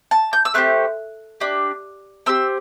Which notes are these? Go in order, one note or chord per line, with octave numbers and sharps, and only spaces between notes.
A5
G6
E6
A3 C4 G4 F#6
D4 G4
C4 G4 E6